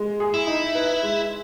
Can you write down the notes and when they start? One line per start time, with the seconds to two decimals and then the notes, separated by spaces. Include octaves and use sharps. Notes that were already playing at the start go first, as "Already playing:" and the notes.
Already playing: G#3
0.20 G#4
0.34 E4
0.47 D#4
0.75 B4
1.03 G#3